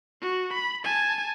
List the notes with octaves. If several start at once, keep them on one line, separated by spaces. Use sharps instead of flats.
F#4
B5
G#5 A5